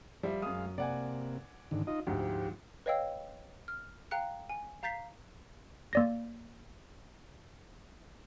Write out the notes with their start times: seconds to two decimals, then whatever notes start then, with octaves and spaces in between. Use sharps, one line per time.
0.23 F3 G3 E5
0.42 F#2 G#3 F5 D#6
0.78 C3 A#3 D5 F#5 G#5
1.71 G#2 D3 D#3
1.87 D#4 F4 D#5
2.07 D2 G#2 F3 G4
2.86 B4 C#5 D#5 F5 G5 E6
3.68 F6
4.11 F5 G5 A#5 F#6 C#7
4.49 G#5
4.83 F5 A#5 G6 A6 B6 C7
5.93 A#3 D5 A#6